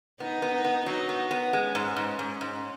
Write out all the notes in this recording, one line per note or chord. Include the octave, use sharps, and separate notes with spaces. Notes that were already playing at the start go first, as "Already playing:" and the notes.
B3 D#4
B3
D#4
B3
F#3 D#4
B3
B3
G#3 C#4
G#2
G#2
G#2
G#2